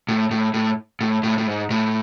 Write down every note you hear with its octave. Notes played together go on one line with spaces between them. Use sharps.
A2
A2
A2
A2
A2
A2
G#2
A2